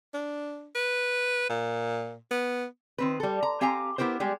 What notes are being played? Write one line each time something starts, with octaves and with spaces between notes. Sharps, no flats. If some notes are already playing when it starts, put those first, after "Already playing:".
D4
B4
A#2
B3
D#3 C4 B4
G3 A4
A#5
C4 G4 F5 G#5 A#5
B3 E4 G4 A#4 C5
G3 G#3 G4